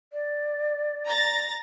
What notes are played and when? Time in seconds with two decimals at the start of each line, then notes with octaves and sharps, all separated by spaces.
0.13 D5
1.07 A#5 A6 A#6